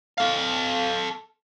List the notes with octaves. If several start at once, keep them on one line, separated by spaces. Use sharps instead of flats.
A4 F5